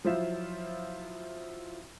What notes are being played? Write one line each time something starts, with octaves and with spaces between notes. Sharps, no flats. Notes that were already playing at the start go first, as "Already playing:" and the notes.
F3 F#3 E4 F4 C5 E5